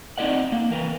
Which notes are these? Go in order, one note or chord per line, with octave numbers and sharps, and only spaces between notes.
C4 D#4 E4 D5 D#5 F#5
A#3
E3 A#4 B4